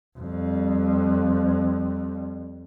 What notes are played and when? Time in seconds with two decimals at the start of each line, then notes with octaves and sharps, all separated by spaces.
0.18 F2 G3